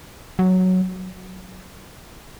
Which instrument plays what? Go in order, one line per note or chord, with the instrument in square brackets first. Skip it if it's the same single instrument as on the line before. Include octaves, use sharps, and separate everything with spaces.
[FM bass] F#3